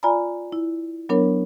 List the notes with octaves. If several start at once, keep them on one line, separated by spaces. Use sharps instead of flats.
F4 D5 G#5 A#5 B5
E4
F#3 B3 D4 A#4 C#5